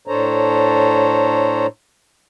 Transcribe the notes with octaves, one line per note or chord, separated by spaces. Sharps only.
A2 D4 A4 C5 C#5 A#5